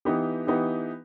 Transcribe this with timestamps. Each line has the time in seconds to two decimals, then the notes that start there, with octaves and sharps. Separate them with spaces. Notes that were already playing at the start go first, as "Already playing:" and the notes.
0.05 E3 B3 D#4 G4
0.47 E3 B3 D#4 G4